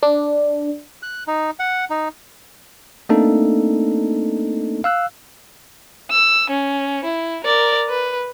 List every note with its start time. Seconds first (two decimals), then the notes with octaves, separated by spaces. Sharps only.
0.03 D4
1.02 F#6
1.27 D#4
1.59 F#5
1.90 D#4
3.09 A3 A#3 C4 D4 D#4 A4
4.84 F5 E6 F#6
6.11 E6
6.50 C#4
7.04 E4
7.44 A#4 D5
7.89 B4